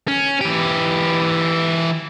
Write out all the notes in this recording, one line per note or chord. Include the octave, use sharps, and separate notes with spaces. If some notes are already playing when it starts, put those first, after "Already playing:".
C#4
E3 G4